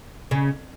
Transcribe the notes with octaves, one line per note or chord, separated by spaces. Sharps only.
C#3